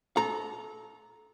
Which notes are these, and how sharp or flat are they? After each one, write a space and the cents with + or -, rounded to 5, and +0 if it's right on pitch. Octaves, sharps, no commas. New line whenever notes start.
A4 -25 A#5 +0